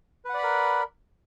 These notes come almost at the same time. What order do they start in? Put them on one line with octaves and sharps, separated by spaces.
B4 F#5 D5 B5 A#4